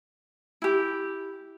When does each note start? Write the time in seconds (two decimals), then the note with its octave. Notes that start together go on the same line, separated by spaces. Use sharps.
0.62 E4 G4